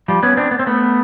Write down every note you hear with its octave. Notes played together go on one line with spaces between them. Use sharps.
F3 G3
B3 C#4
C4 D4
B3
C4
A3 B3